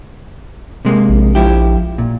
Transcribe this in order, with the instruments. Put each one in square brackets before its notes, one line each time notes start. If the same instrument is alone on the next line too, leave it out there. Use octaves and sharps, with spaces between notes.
[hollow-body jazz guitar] C3 G#3 A#3
[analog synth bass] A#1
[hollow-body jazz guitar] F3 E4 G4
A#2